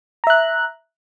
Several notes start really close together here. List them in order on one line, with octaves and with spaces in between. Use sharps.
A#5 E5 F#6